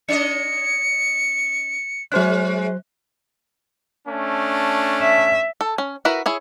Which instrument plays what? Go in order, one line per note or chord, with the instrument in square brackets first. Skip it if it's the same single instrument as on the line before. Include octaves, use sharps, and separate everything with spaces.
[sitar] C#4 D#5 [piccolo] C#7
[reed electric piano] F#3 C5 F#6 [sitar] G#3 C#4
[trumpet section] A3 C#4 D4
[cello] E5
[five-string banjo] A4
C#4
E4 F#4 A#4 B4
E4 G#4 C#5